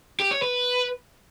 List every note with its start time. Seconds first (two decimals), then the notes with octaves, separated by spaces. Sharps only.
0.20 G4
0.31 C#5
0.42 B4